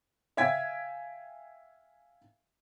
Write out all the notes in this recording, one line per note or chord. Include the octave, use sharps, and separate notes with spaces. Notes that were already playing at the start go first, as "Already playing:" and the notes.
E5 F5 G5 G#5 G#6 B6